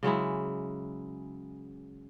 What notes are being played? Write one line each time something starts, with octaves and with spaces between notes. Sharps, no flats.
C#3 F#3 G#3 E4